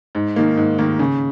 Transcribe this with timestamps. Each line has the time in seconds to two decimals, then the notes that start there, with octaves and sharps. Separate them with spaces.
0.15 G#2
0.36 D#3 A#3
0.57 G#2
0.78 D#3 A#3
0.99 C#3